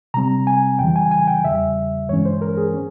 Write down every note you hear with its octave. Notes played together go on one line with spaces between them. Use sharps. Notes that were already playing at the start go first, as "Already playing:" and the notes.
C3 G3 C4 A#5
G#5
F2 C#3 E3 G3 G5
G#5
G#5
G5
E2 C#3 G3 E5
G2 E3 G#3 C#4 C#5
C5
A#4
G#4
C#4